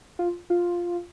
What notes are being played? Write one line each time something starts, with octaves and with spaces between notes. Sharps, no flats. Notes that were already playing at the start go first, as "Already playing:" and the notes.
F4
F4